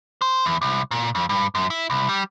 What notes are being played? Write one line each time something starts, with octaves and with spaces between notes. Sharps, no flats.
C5
E2
C2
A#2
F2
G2
F#2
E4
C2
G3